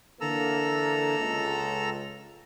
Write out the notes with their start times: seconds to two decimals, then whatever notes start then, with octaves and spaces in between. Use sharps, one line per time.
0.21 D3 E3 A#3 A4 A#5 E6
1.19 C#2